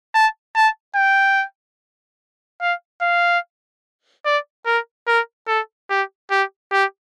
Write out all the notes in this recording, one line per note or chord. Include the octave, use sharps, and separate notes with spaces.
A5
A5
G5
F5
F5
D5
A#4
A#4
A4
G4
G4
G4